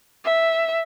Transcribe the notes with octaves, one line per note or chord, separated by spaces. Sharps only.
E5